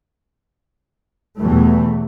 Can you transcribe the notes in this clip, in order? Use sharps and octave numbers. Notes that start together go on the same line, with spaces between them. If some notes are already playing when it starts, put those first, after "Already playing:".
E2 B2 E3 F#3 G3 A3